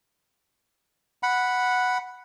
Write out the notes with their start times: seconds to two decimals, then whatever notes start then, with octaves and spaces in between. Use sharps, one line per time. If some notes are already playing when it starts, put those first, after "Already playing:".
1.23 F#5 B5